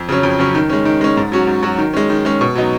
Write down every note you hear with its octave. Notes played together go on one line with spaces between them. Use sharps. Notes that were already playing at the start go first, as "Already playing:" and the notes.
Already playing: F2
C#3 F#3 C#4
F2
C#3 F#3 C#4
D#3
G#3 C#4
D#3
G#3 C#4
G#2
F#3 C#4 F#4
G#2
F#3 C#4 F#4
D#3
G#3 C#4
D#3
G#3 C#4
B2
F#3 B3 D#4